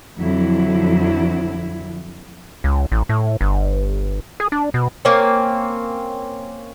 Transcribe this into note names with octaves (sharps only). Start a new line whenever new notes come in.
F2 D3 F#3 E4
C#2
A1
A2
G1
G#4
D4
B2
A#3 C4 C#4